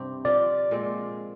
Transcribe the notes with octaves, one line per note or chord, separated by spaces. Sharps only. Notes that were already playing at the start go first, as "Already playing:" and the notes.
Already playing: G2 C3 C4 G4
F3 C4 F4 D5
A#2 G#3 C4